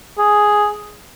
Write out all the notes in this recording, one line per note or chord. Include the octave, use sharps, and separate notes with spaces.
G#4